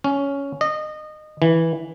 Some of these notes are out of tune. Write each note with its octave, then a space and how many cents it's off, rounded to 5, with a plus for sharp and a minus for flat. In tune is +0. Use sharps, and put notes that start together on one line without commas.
C#4 +10
D#5 -25
E3 -10